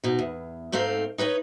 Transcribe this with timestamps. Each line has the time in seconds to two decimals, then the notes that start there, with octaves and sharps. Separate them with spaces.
0.04 B2 D#4
0.19 E2
0.72 G#2 A3 C4 D#4 F5
1.18 D#4 B4 C#5 D#5